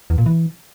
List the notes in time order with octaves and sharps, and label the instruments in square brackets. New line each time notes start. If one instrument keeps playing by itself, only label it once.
[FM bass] E2
A#2
E3